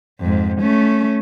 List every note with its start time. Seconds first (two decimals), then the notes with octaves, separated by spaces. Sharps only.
0.21 F2 G#2
0.61 A3 C#4